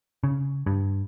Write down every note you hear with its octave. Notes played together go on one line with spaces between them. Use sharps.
C#3
G2